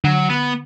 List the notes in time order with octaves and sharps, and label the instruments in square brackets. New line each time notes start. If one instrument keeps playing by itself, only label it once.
[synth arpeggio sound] D3 [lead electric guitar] F#3
[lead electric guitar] B3